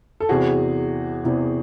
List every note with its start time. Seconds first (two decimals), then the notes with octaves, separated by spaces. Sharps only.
0.20 A4
0.29 E2 C3 E3 F#4 G#4
1.24 E2 C3 E3